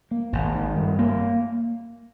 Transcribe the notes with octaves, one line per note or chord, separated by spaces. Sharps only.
A#3
G#1
D#3
G2
A#3